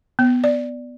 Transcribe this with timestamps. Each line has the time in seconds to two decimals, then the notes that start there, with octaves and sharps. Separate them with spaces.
0.19 B3
0.44 D5